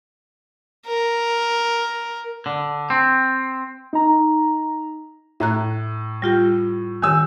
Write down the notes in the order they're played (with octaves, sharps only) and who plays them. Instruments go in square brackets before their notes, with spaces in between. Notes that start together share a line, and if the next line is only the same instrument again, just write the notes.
[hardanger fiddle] A#4
[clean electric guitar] D3
C4
[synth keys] D#4 A#5
[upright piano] A2 [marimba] E5 A#5 F#6
[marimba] G3 F4 G4
[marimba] D#3 G4 [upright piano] G#5 E6